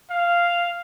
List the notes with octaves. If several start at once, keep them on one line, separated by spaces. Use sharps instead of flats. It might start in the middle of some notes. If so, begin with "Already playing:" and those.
F5